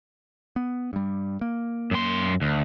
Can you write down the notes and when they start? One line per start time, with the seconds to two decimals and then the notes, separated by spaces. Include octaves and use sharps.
0.56 B3
0.93 G2 G3
1.41 A#3
1.91 F#2 C6
2.42 D2